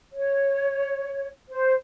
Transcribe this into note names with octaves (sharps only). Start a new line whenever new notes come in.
C#5
C5